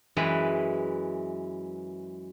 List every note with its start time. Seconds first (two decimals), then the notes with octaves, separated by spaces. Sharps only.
0.17 F#2 E3 G#3 B4 G5